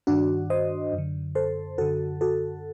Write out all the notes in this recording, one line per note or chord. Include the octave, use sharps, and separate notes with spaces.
G2 D#3 D4 F#4
C5 D#5
F#2
D3
A4 C5
F#2 D3 F#4 A4
F#4 A4